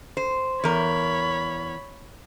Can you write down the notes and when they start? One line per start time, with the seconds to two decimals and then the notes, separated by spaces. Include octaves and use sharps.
0.17 C5
0.64 E2 A#4 C#5 B5